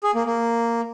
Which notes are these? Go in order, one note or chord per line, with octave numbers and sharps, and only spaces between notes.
G#4
A#3
A#3